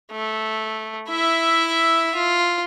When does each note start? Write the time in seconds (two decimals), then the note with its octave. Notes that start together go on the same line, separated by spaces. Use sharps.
0.12 A3
1.09 E4 E5
2.15 F4